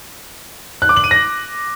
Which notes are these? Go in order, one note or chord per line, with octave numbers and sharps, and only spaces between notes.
F#6
D6
F#7
D#7
A#6